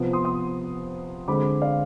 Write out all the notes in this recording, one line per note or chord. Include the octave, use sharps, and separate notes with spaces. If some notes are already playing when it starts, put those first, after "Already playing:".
Already playing: C3 F3 B3
C6 D#6
C6 D#6
D3 G#3 C4 B5 D6
D5 F5